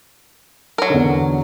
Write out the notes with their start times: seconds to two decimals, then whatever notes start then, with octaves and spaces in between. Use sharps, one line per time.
0.78 F#3 A#4
0.90 E2 D3